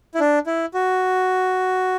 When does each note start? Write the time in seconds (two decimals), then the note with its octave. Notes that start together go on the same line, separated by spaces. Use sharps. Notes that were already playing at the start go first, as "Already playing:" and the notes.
0.15 E4
0.20 D4
0.46 E4
0.74 F#4